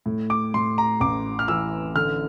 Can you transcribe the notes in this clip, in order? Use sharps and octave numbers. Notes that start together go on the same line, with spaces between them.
A2
D6
A2 C6
A#5
A1 D6
F6
E3 E6
D3 F6